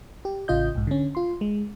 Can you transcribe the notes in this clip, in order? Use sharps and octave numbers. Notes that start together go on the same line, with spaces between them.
G4
A1 C#3 F4 D#5 G6
B1 G#2
D3 C#4
F4 C6
G#3